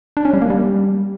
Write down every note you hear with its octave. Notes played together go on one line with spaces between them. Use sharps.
D4
C#4
G3
A#3
G3